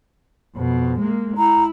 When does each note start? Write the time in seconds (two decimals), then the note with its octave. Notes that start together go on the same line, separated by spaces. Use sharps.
0.56 F2 B2
1.00 G#3 A#3
1.38 E4 A#5